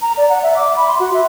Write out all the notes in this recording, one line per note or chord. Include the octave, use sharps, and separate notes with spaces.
A#5
D5
F#5
E5
D6
B5
C6
F#4
E5